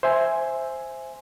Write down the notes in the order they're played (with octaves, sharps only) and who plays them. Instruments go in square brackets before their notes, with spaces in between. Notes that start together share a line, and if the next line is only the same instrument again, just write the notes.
[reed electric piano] C5 E5 G#5